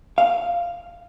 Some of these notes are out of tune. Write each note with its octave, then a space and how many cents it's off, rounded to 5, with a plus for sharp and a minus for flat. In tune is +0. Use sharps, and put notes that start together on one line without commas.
F5 -5